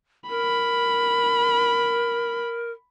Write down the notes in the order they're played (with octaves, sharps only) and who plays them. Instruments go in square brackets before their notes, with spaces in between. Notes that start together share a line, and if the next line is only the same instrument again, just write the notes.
[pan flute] A#4 [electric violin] B5